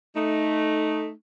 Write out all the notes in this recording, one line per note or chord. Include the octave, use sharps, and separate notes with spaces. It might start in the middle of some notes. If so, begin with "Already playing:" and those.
A3 D#4